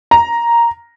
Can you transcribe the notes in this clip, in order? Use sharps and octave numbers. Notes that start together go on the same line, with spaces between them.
A#5